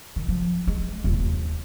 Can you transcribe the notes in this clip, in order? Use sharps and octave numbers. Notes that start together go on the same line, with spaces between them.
D#3
F3
G#3
D#1
D#2